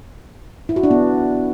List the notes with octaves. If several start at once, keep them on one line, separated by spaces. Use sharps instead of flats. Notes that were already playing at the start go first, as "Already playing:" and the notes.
E4
F#4
D4
B3